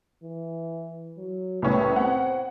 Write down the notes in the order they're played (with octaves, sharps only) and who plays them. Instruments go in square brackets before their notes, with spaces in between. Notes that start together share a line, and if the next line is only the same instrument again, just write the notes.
[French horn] E3
F#3
[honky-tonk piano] C2 A2 C#4 [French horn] B3
[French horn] C4 [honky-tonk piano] F#5